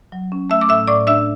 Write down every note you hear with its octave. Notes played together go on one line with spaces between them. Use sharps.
F#3
C#4
A3 E5 E6
D6
A2 E5 E6
A2 D5 D6
D4 E5 E6